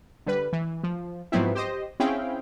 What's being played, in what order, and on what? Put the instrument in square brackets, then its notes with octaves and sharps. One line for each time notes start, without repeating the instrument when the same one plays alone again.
[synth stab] D3 G3 B4
E3
F3
G#2 F3 F#3 B3 C4 E4
G4 C5 D#5
C4 C#4 E4 G#4 F5 G5